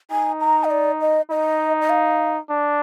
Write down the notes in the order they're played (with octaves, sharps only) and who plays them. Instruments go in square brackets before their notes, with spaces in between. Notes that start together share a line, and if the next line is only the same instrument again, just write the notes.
[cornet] D#4 [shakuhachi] G#5
[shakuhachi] A#5
D#5
D5
D#5
[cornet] D#4 [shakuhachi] D#5
[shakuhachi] D#5
F5
[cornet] D4